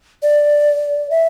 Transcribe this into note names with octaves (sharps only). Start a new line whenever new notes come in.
D5
E5